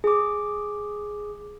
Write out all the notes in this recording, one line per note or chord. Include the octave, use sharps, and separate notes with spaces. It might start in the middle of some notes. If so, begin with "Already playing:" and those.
G#4 D6